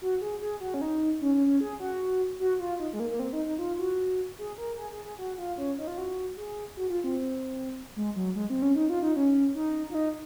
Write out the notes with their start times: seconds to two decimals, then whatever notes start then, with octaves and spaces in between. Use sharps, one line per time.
0.01 F#4
0.21 G#4
0.41 G#4
0.61 F#4
0.74 C#4
0.81 D#4
1.21 C#4
1.34 C#4
1.47 C#4
1.61 G#4
1.80 F#4
2.40 F#4
2.60 F4
2.79 D#4
2.93 G#3
3.00 A#3
3.10 A#3
3.19 C4
3.33 D#4
3.45 D#4
3.59 F4
3.79 F#4
4.39 G#4
4.58 A#4
4.78 G#4
4.92 G#4
5.05 G#4
5.19 F#4
5.38 F4
5.58 C#4
5.78 D#4
5.87 F4
5.98 F#4
6.37 G#4
6.77 F#4
6.90 F4
7.04 C4
7.96 G#3
8.16 F#3
8.35 G#3
8.50 C4
8.62 C#4
8.76 D#4
8.89 F4
9.03 D#4
9.16 C#4
9.55 D#4
9.90 F4
9.95 D#4